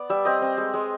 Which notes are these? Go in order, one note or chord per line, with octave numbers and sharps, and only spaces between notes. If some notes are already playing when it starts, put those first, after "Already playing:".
Already playing: B3 D5
G3 E5
C4 D#5
C4
G#3
G#3